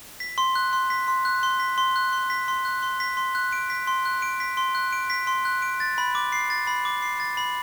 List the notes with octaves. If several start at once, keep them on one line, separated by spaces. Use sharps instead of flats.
B6
C6
F#6
C6
B6
C6
F#6
C6
B6
C6
F#6
C6
B6
C6
F#6
C6
B6
C6
F#6
D7
B6
C6
F#6
D7
B6
C6
F#6
D7
B6
C6
F#6
D7
A6
B5
D6
C7
A6
B5
D6
C7
A6
B5